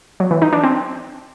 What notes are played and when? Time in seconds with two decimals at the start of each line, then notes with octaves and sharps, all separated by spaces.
0.20 F#3
0.31 E3
0.42 D#4
0.53 D4
0.63 C4